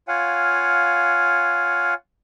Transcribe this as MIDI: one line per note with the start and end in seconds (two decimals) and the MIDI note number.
0.08 1.94 65
0.08 1.94 73
0.08 1.94 77
0.08 1.94 78
0.08 1.94 80